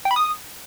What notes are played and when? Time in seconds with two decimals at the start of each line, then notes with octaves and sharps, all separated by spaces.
0.05 G5
0.11 B5
0.16 D#6